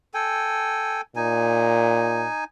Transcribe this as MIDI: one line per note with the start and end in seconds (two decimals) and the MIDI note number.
0.14 1.01 69
0.14 1.01 79
0.14 1.01 80
1.16 2.26 46
1.16 2.44 63
1.16 2.44 80